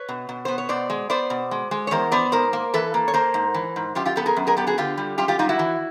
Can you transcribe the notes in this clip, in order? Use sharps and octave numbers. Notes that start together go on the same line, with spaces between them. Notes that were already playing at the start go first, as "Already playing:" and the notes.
Already playing: B4 C#5
B2
B2
B3 C5
C#5
B2 C5 D5
G#3
B3 C5 D5
B2
G#3
G#3
C#5
E2 A#4 C5
B3 C5 D5
G#2 A#4 C5
A#3
E3 A4 B4
A#3
C#5
A#3 A#4 C5
G#2
E3
G#2
F#2 F4 G4
F4 G4
B3 G4 A4
G#4 A#4
F#2
G#4 A#4
B3 G4 A4
F#4 G#4
D3 F4 G4
G3
F#2 F4 G4
F4 G4
G3 D#4 F4
E4 F#4
E3